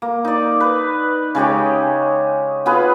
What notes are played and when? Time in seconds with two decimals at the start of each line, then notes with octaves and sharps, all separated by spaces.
0.02 A#3
0.24 D#4 D5
0.60 B4
1.35 C#3 G#3 G4 C#5
2.66 B3 F4 G#4 B4